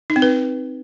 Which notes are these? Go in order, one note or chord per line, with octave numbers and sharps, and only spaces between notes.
D#4
C4
B4